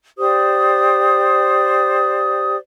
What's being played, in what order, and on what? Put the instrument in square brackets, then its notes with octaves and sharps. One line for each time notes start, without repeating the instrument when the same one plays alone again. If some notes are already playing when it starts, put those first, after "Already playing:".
[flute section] G4 C5 D5 D#6